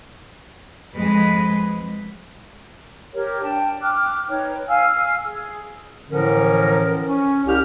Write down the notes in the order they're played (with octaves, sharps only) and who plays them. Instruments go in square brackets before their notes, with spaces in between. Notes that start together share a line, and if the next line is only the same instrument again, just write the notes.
[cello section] F2 G#3 B4
[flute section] G4 A#4 C#5
D4 G5 A5
G5 D6 F6 F#6
D#4 B4 C#5 G5
F5 G#5 E6 F6
G#4
[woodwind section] A2 D3 E3 F3 C#4 A#4
C#4
C2 G4 F6